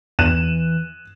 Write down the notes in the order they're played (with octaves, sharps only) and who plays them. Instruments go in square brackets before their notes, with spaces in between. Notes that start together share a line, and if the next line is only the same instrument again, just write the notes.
[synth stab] E2 [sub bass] E3 [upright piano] F#6 D#7 E7